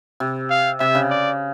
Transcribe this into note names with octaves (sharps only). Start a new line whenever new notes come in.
C3
F5
C3 E5
C#3
D5